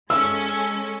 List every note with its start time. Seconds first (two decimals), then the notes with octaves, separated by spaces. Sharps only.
0.10 G#3 C#4 A4 E6